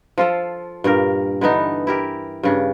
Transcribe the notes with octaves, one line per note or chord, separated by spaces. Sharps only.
F3 F4 A4
G2 A#2 G4 A#4
D3 E3 B3 D#4
E4 G4 A#4
G2 C#3 D4